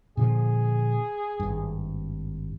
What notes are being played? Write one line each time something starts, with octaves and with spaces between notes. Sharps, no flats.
A#2 D3 F3 G#4
G#1 G2